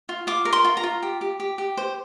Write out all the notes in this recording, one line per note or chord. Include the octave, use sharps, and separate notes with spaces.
F4
F4 D6
A#4
C6
F4
A#5
F4
G4
G4
G4
G4
C5